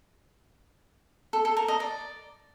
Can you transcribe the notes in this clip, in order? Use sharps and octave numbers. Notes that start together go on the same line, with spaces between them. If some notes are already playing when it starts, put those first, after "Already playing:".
A4
A4
A#4
D#5
D5